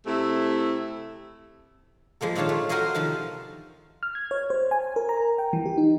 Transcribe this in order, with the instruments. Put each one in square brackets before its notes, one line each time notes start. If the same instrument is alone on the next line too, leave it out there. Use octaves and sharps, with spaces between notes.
[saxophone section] C3 A3 E4
[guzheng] F3 G#3 A#3 A4
A#2 D#3 D4 F4 C#5 A5
A3
F#4 A#4 C5 C#5 D#5 F5
C3 D#3 F3 D#4 A5
[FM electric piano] F6
G#6
C#5
C5
G#5
A#4
A#5
G5
E3
G4
D#4